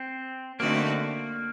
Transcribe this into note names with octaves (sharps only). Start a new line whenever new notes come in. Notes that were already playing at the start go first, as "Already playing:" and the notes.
Already playing: C4
D3 A3 A#3 C4 D#4 F#4